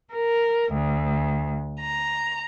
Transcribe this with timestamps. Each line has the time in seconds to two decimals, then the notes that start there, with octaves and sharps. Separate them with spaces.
0.14 A#4
0.74 D2
1.81 A#5